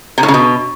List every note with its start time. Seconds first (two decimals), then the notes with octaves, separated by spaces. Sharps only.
0.18 C3
0.23 A2
0.28 C#3
0.34 B2